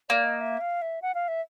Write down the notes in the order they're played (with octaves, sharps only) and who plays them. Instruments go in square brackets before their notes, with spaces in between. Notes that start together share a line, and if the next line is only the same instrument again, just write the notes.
[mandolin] A#3 [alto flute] D5
[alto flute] D#5
E5
F5
E5
F#5
F5
E5